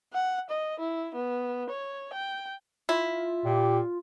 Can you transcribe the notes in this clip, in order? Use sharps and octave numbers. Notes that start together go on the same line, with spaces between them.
F#5
D#5
E4
B3
C#5
G5
E4 F4
A#2 G4